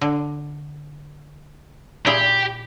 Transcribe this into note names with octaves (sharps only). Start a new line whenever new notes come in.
D3
A#2 E4 G4 G#4